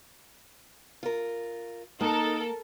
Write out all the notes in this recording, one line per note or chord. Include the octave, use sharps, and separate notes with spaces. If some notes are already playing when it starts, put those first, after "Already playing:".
F4 A#4
A#3 D#4 A4 A#4 F#5